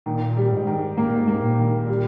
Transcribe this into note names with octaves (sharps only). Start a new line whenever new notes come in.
A#2 D#3
G3
G#2
D#3
G#2 A#3
A#2
G#2
A#3
A#2
D#3
G3